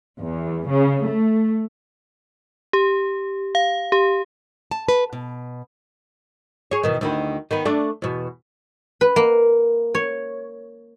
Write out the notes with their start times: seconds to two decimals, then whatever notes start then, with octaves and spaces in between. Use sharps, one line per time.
0.20 E2
0.70 C#3
1.05 A3
2.73 G4
3.55 F5
3.92 G4
4.71 A5
4.88 B4
5.13 B2
6.71 G#4 C#5
6.83 E2 B2 D#3
7.01 D2 D#3 E4
7.51 D#3 B3
7.65 A3 D4
8.02 E2 B2
9.01 B4
9.16 A#3
9.95 C#5